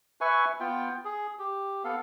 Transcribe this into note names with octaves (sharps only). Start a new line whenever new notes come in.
B4 E5 G#5 C#6
B3 F4 G5
G#4
G4
B3 A4 F5